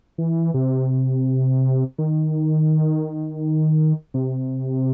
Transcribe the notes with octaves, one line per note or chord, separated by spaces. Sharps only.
E3
C3
D#3
C3